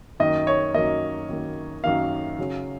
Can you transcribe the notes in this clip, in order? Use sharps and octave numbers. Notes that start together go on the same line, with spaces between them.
F#2 D#3 A#3 D#5
C#5
F#2 D#3 A#3 D#5
F#2 D#3 A#3
F#2 D#3 A#3 F5
C#3 F#3 C#4